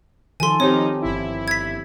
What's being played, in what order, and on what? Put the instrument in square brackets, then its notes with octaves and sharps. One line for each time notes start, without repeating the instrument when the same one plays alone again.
[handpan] D#3 F3 A4 [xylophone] G#5 C6
[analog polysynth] F3 D#4 [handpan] C4 G4 [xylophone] C#5
[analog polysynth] G1 E4
[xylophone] G#6 B6